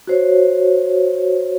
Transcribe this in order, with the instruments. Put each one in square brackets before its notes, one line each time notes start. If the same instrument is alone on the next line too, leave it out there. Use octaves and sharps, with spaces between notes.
[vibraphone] F#4 C5 C#5